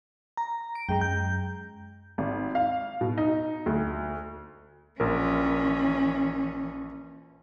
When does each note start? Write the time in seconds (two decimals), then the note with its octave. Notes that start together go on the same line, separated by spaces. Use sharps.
0.37 A#5
0.75 D7
0.89 F#2 G#3 G5 A#5
1.01 G6
2.18 G#1
2.55 F5
3.01 B2
3.18 D#4
3.66 D2
5.00 A#1 E3 C#4 A#4